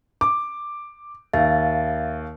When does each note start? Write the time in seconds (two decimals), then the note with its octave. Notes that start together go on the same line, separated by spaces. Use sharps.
0.21 D6
1.33 D#2 E5 F5 A6